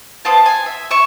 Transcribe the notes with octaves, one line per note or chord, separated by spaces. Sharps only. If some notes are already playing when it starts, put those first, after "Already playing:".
B3 C4 F4 A5
G#5
E5
E5 C#6